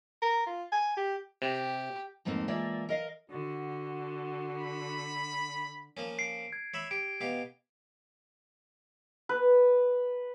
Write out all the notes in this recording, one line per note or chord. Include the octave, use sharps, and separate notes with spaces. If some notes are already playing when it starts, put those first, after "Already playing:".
A#4
F4
G#5
G4
C3 G4
F2 G#2 A3 A#3 C4
E3 G#3 A#3 F4 D5 E5
A#4 D#5 F5
D3 F#4
B5
F3 A#3 C#4
C7 D7
G#6
C#5 E5 B5
G4 D7
B2 G4 F5
B4